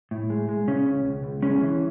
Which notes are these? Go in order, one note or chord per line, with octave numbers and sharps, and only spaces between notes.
A2
G#3
G#3
C#3 C#4
C#2
C#2
C#2
G#3 C#4
E3